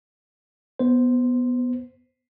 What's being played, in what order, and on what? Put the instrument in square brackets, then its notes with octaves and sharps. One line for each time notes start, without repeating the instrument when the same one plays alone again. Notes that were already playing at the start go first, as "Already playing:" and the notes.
[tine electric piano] B3 C5